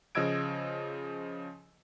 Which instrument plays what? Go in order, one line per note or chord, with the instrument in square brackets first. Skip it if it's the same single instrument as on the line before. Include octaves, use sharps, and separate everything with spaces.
[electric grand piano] C#3 F3 D#5 E6 G#6 D7